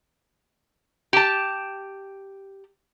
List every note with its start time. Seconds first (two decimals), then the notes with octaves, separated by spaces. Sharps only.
1.13 G4 A5